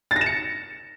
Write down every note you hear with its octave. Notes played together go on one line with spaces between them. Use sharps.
A6
A#6
E7
C#7